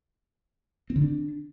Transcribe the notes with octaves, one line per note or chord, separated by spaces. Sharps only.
C4
D3
D4